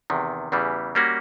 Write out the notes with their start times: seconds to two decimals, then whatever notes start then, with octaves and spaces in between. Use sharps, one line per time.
0.10 E2 C3 D#3
0.52 E2 C#3 E3 G3
0.95 G3 A#3 C#4 F#4